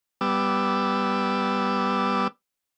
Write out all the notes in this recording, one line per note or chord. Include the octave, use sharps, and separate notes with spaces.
G3 B3 D6 E6